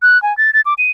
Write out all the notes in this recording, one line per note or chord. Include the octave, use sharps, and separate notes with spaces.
F#6
G#5
A6
A6
D6
D#7